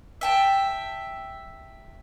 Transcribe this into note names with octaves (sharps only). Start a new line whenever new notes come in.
E5 G5 A5